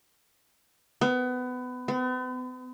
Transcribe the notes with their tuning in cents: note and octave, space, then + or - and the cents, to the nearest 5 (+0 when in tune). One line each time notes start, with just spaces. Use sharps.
B3 +25
B3 +45